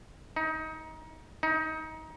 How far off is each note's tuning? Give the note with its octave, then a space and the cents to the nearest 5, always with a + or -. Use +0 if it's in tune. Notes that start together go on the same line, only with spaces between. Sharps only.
D#4 +25
D#4 +25